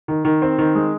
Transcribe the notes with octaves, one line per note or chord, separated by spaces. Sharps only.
D#3
D#3
C4
D#3
G#3